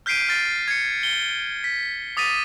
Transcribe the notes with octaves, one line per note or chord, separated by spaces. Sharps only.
F6 G6 B6 C7 D7 D#7
F6 A6 C7
G#6 C#7
C#7 G7
B6
D6 D#6 A6 B6 D#7